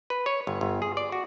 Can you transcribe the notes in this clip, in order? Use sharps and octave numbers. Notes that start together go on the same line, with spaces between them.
B4
C#5
G1
G1
G#4
D5
F#4